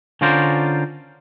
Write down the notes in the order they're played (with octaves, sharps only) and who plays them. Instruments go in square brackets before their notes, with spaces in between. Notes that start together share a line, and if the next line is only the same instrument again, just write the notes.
[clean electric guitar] D3 C#4 F4 A#4 C5 D5